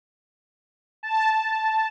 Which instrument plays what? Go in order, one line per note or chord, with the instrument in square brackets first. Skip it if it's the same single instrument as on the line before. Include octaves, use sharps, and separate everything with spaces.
[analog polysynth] A5